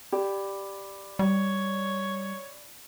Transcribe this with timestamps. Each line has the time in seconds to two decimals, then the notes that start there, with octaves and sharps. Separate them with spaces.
0.12 G4 D5 B5 D6
1.19 G3 C#5